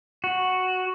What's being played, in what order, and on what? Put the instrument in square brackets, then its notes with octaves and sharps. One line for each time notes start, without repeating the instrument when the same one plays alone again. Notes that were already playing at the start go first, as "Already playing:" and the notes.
[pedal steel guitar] F#4